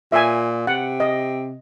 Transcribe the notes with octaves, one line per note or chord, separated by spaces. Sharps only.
A#2 E5 G#5
C3 F#5
D#5